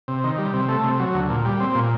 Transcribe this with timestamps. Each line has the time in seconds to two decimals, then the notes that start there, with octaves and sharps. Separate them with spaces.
0.08 C3
0.24 D#3
0.38 G3
0.54 C3
0.69 A3
0.84 C3
1.00 F#3
1.14 D2
1.30 A#2
1.45 G3
1.60 C4
1.75 A#2